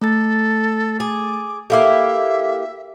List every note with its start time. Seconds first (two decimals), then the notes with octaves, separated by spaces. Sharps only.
0.02 A3 A4 A6
1.00 G#4 D6
1.70 A#3 E4 G4 A4 E5 F5 D6